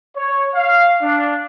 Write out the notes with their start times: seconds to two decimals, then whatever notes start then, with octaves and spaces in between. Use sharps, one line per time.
0.17 C#5
0.55 F5
1.02 D4